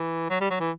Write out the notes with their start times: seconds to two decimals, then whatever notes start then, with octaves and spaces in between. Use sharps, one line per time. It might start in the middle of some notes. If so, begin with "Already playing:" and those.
Already playing: E3
0.30 F#3
0.41 G3
0.50 F#3
0.60 E3